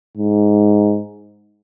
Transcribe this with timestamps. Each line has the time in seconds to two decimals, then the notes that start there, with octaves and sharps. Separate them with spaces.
0.17 G#2